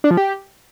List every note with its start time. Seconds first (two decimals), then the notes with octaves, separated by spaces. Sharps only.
0.04 D4
0.11 F3
0.17 G4